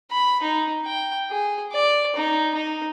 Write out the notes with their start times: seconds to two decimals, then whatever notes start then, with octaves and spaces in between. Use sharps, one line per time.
0.11 B5
0.43 D#4
0.85 G5
1.30 G#4
1.72 D5
2.16 D#4
2.55 D#4